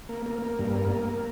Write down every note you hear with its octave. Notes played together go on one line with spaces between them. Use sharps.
A#3
A#3
A#3
G2
A#3
A#3
A#3